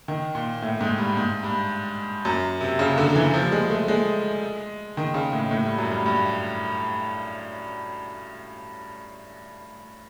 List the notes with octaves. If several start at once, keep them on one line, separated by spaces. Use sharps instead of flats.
D#3
A#2
A2
G#2
G2
G#2
G2
F#2
C3
C#3
D3
E3
F3
G3
G#3
A3
G#3
D#3
C#3
A2
A2
G2
F#2
G2
G2